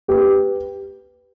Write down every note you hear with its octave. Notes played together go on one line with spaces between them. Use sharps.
G4 B4